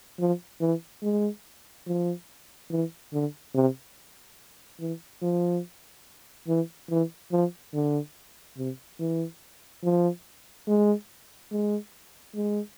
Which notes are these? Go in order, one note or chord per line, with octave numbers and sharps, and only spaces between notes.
F3
E3
G#3
F3
E3
D3
C3
E3
F3
E3
E3
F3
D3
C3
E3
F3
G#3
G#3
G#3